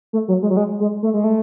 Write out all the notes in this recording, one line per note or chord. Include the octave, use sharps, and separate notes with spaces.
A3
F#3
G#3
F#3
G#3
G#3
A3
G#3
A3